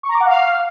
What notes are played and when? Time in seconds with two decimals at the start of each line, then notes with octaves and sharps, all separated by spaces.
0.03 C#6
0.09 A#5
0.15 D6
0.20 F#5
0.26 F5